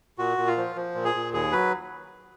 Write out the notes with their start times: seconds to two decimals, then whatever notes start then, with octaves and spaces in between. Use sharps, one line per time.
0.18 A#2 F#4
0.38 A#2
0.47 F4
0.57 F3
0.76 F3
0.95 A#2
1.05 G#4
1.15 A#2
1.33 D#2 G#4
1.52 F#3 B4